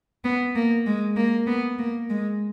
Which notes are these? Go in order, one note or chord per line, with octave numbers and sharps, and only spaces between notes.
B3
A#3
G#3
A#3
B3
A#3
G#3